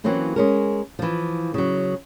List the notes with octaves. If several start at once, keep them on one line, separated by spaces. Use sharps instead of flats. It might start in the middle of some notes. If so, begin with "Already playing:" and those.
E3 F#3 A#3 C4 C#4 E4
G#3 C#4 A#4
E3 F3
C#3 F#3